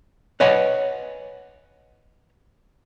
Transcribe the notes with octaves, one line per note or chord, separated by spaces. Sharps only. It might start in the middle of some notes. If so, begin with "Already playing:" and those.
B4 C#5 D#5 F#5 G#5 B5